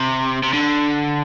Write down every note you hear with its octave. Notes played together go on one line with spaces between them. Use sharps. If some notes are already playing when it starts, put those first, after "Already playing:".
Already playing: C3
C3
D3